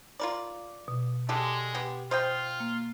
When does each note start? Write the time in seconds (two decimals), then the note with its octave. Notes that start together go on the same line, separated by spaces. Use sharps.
0.19 F4 A#4 D5
0.88 B2
1.29 D3 G#3 G4 A4
1.75 B3 G4
2.11 F4 C5 D#5 G5
2.60 A#3